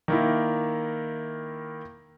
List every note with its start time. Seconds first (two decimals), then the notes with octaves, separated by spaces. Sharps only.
0.08 D#3 A#3 E4